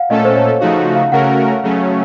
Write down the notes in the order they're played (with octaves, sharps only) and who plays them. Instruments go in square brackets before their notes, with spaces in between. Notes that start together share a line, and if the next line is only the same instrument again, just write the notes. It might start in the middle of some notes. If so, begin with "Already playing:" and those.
Already playing: [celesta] F5 F#5
[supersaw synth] A#2 A3 C#4 A4 [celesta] D#5
[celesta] C5
C#5
[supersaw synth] C#3 F3 A3 D#4 F#4 [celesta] F5
[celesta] D#5
F5
[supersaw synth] C#3 A3 C#4 F#4 A#4 [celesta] F#5
[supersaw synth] C#3 F#3 A3 C#4